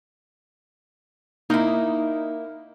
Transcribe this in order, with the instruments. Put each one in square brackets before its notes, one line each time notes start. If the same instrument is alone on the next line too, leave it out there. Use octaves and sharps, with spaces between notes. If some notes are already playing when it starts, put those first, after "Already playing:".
[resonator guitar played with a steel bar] A#3 E4 [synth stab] D#4